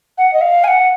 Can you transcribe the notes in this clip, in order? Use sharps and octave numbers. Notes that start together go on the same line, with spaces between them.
F#5
D#5
F5
G#5
F#5